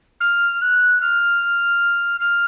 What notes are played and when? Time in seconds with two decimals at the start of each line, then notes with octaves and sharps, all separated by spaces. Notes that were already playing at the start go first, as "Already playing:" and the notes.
0.20 F6
0.61 F#6
1.01 F6
2.20 F6